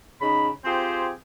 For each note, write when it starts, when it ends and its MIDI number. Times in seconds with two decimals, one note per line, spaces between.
0.22 0.49 49
0.22 0.49 63
0.22 0.49 83
0.65 1.12 60
0.65 1.12 65
0.65 1.12 67
0.65 1.12 68
0.65 1.12 72